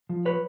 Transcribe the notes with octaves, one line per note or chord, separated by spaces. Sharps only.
F3
B4 C#5